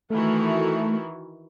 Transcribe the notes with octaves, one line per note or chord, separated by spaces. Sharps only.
D#3 E3 A3 F#4